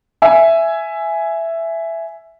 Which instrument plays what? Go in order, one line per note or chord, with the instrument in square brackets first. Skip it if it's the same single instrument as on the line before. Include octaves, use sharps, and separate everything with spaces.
[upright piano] E5 G#5 E6